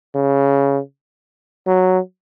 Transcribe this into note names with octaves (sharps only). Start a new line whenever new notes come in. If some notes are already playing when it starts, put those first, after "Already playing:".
C#3
F#3